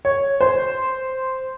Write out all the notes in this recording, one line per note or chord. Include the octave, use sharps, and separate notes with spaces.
C#5
C5